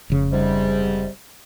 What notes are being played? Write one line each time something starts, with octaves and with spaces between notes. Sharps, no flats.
F1 C#3
G#2 C3 G3